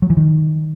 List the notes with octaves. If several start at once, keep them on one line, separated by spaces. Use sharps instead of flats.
F#3
E3
D#3